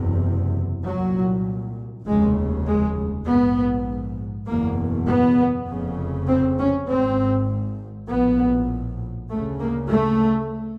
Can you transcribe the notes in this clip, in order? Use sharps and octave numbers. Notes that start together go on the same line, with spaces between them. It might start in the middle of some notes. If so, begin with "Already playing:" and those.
Already playing: F#1 E2 C3
C2 A#2 F#3
F1 D#2 C#3 G#3
G#3
A#1 G#2 B3
F#1 E2 B2 A#3
B3
F1 F2 C#3
C4
C#4
G#1 G#2 C4
A#1 A2 B3
D2 C#3 A3
A#3
A3